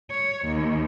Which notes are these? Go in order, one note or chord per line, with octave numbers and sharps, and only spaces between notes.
C#5
D#2